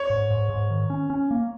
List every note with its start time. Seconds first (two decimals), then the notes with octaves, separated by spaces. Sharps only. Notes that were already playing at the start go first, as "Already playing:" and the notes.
Already playing: C#5
0.10 G#2
0.30 G#2
0.50 G#2
0.70 D#3
0.90 C#4
1.10 C#4
1.31 A#3